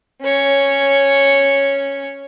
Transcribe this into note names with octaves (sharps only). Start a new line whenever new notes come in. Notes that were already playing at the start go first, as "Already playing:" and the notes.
C#4 C#5